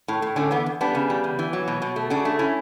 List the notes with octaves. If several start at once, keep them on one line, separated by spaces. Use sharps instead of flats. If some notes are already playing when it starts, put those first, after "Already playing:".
A2
A2
D3 A3 C#4
E2 B3
E2
G3 B3 D4
C#3
G3
E2
E3
F#3
B2
B2
A3
C#3 D4 F#4
A3
C#4 E4